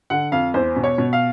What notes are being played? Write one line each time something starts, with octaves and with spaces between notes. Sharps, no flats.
D3 F#5
F2 F5
E2 C5
B2
C#5
B2
F5